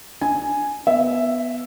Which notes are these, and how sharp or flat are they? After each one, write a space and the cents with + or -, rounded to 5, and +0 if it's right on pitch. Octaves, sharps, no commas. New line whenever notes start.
D4 +0 G#5 +0
B3 +5 E5 +0